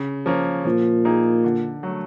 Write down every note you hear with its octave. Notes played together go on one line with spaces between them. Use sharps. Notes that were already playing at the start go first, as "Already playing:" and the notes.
Already playing: C#3
F3 A#3 C#4
A#2 F3
A#3 D#4 G#4
D3
F#3 A3